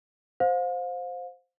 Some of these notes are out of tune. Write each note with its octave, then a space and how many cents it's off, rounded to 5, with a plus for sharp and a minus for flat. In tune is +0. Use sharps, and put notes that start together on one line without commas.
C5 +0 F5 +35